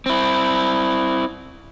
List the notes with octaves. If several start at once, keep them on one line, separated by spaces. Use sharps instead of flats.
C4 E4